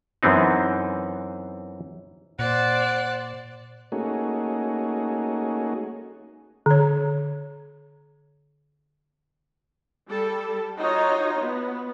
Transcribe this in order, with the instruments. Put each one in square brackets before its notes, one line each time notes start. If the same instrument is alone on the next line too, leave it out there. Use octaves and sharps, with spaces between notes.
[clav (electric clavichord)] F#2 E3 B3 C4 D#4
[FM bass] A#2 [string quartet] C5 D5 [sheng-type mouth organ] F#5 F#6
[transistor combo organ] A3 A#3 C#4 D#4 F#4 G#4
[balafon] D3 C#5
[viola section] G3 A4
D#4 F4 F#4 C#5 D#5
B3